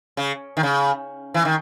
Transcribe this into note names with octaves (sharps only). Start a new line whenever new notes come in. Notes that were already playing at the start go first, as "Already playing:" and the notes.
C#3
D#3
C#3
E3
D#3